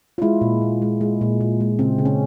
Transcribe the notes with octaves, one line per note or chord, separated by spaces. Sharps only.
F4
G#3 E4
A#2
A#2
G#3
G#3
A#2
A#2
G#3
C#3 C4
C#3
C#4